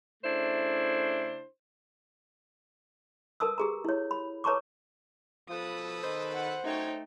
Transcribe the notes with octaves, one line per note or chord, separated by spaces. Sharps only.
C#3 A3 D4 E4 C5
A#4 B4 A5 D#6 E6
G4 G#4 A#5
E4 C#5
B5
B4 C#5 A5 A#5 C#6 D6
B2 F3 A4 B4 D#6
D#3 C5
F#5
F#2 A3 D#4 C#5 G5